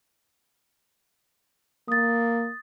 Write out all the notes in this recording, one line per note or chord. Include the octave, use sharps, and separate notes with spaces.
A#3 D#6 A6